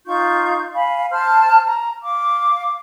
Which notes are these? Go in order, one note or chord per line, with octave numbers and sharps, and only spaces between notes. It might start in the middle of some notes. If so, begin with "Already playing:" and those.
D#4 F4 C#6 G6
F5 G#5 B5
C5 A5 F6
A#5
F5 D6